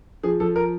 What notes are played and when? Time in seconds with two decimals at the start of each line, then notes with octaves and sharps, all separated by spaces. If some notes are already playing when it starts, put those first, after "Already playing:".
0.23 F3 G#4
0.40 F3 A4
0.56 A#4